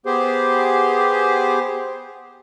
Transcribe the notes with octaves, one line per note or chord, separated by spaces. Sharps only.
B3 G4 G#4 C5